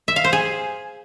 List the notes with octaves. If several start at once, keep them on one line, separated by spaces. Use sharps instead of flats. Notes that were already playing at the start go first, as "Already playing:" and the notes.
E5
F5
C5
G#4